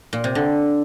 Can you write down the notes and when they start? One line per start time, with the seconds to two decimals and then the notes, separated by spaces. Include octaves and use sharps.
0.13 A#2
0.24 C3
0.35 D3